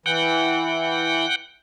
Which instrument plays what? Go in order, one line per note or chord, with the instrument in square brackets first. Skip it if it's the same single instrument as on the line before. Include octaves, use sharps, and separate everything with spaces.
[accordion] E3 [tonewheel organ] F#5 G5